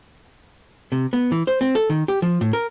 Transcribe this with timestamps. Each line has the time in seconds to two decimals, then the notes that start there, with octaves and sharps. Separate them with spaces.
0.92 C3
1.13 B3
1.32 E3
1.47 C5
1.61 C4
1.75 A4
1.90 D#3
2.08 G4
2.22 F3
2.41 A2
2.53 A#4